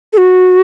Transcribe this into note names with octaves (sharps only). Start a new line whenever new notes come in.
A4
F#4